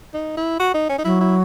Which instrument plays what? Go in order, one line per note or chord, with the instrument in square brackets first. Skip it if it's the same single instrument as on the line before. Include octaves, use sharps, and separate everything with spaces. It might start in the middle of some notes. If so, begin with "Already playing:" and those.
[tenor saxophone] D#4
E4
F#4
D#4
C#4
D#4
[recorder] F#3 [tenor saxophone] E4
[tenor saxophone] E4